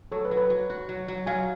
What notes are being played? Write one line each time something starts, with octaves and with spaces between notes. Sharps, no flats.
F#3 A4 C#5
B4
F#3
B4
F#3
F#4
F#3
F#3
F#3 F5 G#5